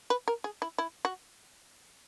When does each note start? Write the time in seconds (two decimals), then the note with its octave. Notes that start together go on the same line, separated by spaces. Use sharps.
0.10 B4
0.28 A#4
0.44 G#4
0.62 E4
0.78 E4
1.05 F#4